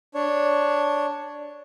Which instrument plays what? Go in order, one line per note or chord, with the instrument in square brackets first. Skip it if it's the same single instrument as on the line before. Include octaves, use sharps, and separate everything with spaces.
[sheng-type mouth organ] D4 C#5